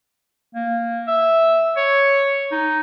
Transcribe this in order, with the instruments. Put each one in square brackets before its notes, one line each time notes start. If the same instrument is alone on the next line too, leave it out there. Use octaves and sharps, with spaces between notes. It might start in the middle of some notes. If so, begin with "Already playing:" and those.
[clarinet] A#3
E5
C#5
D#4